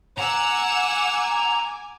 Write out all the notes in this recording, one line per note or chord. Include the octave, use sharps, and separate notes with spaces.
F#5 G#5 A#5 D6 E6